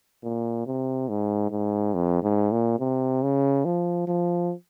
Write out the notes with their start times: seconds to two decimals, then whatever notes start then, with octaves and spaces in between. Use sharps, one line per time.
0.24 A#2
0.66 C3
1.08 G#2
1.51 G#2
1.94 F2
2.23 G#2
2.52 A#2
2.79 C3
3.22 C#3
3.65 F3
4.08 F3